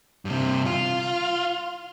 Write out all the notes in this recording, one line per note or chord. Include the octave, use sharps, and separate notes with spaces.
G2 C3
F4